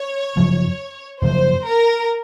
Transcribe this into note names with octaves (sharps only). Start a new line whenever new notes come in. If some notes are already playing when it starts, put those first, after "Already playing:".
Already playing: C#5
F#2 C#3 F3 A#3
F#2 C#3 F3 A#3 C5
A#4